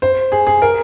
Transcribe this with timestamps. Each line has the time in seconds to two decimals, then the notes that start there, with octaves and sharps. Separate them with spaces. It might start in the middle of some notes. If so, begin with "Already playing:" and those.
0.02 C5
0.32 G#4
0.47 G#4
0.62 A#4